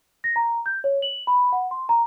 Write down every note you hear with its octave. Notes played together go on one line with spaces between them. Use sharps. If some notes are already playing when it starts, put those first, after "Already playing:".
A#6
A#5
G6
C#5
F#7
B5
F#5
C6
A#5